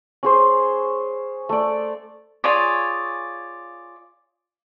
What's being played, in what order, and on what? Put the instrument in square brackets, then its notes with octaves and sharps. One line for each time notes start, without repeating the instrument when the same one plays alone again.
[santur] C#4 G#4 C5
A3 D5
[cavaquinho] F4 G#4 C#5 D5